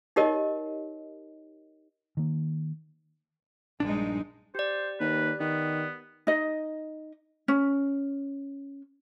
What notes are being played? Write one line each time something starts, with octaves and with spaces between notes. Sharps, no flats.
D#4 G4 A#4 C#5 D#5
D#3 A#3
A#1 G2 G#3 D4 D#4
G4 C5 D5
D#2 B4
D#3 B3
D#4 D#5
C#4